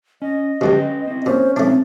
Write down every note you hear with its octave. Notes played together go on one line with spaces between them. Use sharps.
C#4 D#5
D2 G2 B2 C#4 B4 G5
C4 E4
A#2 C#4 C5
B2 A3 B3 C4 D4 D#4